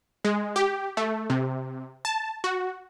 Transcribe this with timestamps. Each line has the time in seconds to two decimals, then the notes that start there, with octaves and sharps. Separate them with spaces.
0.25 G#3
0.56 G4
0.97 A3
1.30 C3
2.05 A5
2.44 F#4